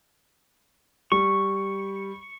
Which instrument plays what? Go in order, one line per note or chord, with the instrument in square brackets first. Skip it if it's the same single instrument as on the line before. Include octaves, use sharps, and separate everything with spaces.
[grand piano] G3 [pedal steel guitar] C#6